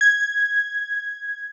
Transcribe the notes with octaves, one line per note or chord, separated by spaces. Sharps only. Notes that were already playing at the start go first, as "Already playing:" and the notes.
G#6